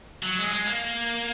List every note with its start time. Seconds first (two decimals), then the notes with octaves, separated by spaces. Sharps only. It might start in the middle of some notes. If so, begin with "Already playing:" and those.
0.23 F#3
0.38 G#3
0.52 G#3
0.67 A#3